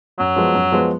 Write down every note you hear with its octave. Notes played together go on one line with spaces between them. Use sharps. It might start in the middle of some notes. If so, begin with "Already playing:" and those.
F#2 F#3
F3 G#3 B3
F#2
F3 G#3 B3